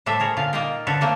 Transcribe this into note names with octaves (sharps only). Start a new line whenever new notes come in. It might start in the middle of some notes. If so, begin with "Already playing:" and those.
A2 G3 A3 A4 C5 E5
G#4 A#4 C#5
A#2 D3 F4 F5
A#3 D#4 F4 D#5 F5 G5
D3 A4 B4 C#5
A3 A#3 C4 G5